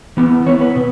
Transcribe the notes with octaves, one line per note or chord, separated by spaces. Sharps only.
E3 B3
E3 B3 C#5
B4
B2